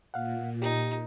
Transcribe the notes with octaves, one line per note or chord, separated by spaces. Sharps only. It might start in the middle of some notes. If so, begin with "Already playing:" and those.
A#2 F5 F#5
D#4 G4